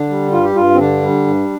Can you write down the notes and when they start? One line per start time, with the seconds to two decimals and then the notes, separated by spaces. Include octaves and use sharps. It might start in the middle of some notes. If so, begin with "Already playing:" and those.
Already playing: D3 D4
0.09 G3
0.32 G2 F4
0.44 G4
0.55 G2 F4
0.74 C4
0.79 D3 D4
1.02 G3
1.27 G2